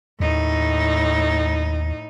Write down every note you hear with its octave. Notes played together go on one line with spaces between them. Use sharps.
D#2 A2 D#4